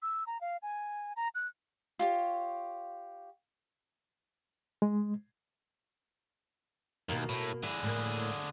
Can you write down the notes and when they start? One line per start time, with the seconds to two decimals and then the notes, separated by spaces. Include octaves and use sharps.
0.02 E6
0.27 A#5
0.41 F5
0.62 G#5
1.16 A#5
1.35 F#6
1.99 F4 G4 C#5
4.82 G#3
7.09 D#2 B2 A#3 A#4
7.29 A2
7.63 D3 E4 G#4
7.83 A2 A#3